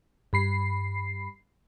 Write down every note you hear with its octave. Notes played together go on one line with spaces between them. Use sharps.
G2 B5 C7